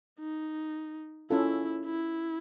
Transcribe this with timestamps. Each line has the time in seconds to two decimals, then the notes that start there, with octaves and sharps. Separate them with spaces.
0.20 D#4
1.30 C#4 E4 F4 A4
1.86 E4